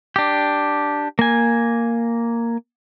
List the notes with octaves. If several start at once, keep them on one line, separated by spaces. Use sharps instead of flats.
D4 G4
A#3 G#5